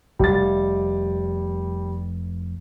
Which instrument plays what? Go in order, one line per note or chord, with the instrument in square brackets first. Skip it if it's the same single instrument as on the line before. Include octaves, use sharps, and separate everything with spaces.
[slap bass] F1 [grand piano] G3 A6